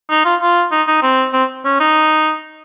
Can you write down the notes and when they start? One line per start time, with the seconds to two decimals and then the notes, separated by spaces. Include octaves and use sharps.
0.10 D#4
0.25 F4
0.42 F4
0.72 D#4
0.88 D#4
1.03 C4
1.33 C4
1.65 C#4
1.80 D#4